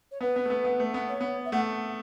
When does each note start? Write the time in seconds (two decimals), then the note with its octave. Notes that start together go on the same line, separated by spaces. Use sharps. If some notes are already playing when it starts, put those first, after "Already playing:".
0.11 C#5
0.21 B3 B4
0.36 B3
0.45 A3
0.50 B3
0.65 B3
0.80 A3
0.94 B3
1.09 C#5
1.21 B3
1.45 E5
1.52 A3 F#5